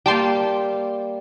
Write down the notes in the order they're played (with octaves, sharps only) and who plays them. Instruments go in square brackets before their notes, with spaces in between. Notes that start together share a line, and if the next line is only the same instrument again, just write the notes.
[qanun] G3 A#3 [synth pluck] G5 A5 C6